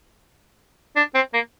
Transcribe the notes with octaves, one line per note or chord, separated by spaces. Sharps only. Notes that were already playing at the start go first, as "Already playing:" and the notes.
D4
C4
A#3